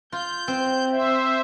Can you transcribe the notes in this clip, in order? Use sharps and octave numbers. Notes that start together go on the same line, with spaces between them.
F4 G6
C4
C5 E5